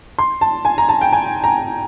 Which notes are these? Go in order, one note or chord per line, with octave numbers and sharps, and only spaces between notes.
C6
A5
G#5
A#5
A5
G5
G#5
A#5